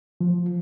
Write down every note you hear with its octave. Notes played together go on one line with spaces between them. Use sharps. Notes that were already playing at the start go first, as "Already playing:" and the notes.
F3